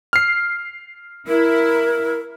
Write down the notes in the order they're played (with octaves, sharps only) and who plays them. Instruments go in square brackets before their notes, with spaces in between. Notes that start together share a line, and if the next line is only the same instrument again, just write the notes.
[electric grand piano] F6 C7
[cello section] E4 [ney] A#4